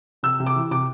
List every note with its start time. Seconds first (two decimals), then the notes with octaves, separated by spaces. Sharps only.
0.23 C3 E6
0.40 C3
0.46 D6
0.56 E3
0.71 C3 D6